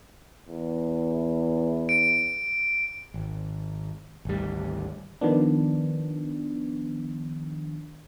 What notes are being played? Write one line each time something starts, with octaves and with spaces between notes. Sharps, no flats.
E2
D7
G#1
G#1 D2 G3
D#3 F3 B3 D4